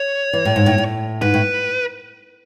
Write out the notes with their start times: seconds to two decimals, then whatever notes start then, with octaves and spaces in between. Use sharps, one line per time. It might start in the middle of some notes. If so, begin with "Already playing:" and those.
Already playing: C#5
0.33 E3
0.45 A2
0.56 G#2
0.66 A2
0.78 A2
1.21 G#2 B4
1.34 A2